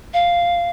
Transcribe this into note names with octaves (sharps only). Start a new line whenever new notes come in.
F5